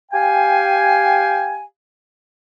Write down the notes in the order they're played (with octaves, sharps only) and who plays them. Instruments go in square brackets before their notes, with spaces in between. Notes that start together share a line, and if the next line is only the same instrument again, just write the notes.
[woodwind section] G4 F5 G5 G#5